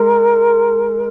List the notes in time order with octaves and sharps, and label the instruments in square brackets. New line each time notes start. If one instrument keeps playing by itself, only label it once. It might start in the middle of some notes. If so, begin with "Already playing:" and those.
Already playing: [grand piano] G#3 [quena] A#4